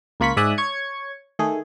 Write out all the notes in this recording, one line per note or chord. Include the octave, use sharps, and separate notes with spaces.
C#2 A#3 F4 B5 C#6 B6
G#2 D5 E5 G#5 D#6 F#6
C#5 G#6 C#7
D#3 A3 G#4